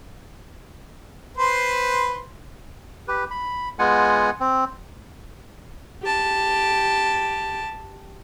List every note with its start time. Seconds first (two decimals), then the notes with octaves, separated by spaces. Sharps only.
1.37 B4 C5 C6
3.08 G4 B4
3.31 B5
3.79 G#3 B3 F4 F#5 G#5
4.40 C4
6.03 G4 A5